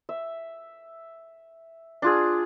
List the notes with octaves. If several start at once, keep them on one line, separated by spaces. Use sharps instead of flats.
E5
D4 F4 G#4